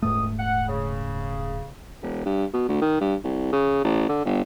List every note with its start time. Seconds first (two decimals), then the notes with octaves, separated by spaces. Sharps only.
0.02 D#1 C#2 G#2 A3 D#6
0.38 F#5
0.68 C#3
2.02 E1
2.25 G2
2.53 B2
2.68 D2
2.81 D#3
3.00 G2
3.24 C2
3.52 C#3
3.84 A1
4.09 D3
4.25 G1